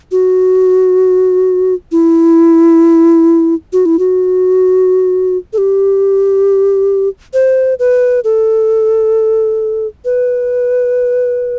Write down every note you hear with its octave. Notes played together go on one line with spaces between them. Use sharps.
F#4
E4
F#4
E4
F#4
A4
G4
C5
B4
A4
B4